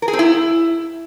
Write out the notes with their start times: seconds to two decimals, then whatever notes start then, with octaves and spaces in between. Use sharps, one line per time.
0.02 A#4
0.08 G#4
0.13 C4
0.19 E4